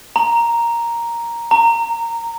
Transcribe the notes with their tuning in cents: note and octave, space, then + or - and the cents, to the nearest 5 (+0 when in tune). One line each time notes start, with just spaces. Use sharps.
A#5 +0
A#5 -15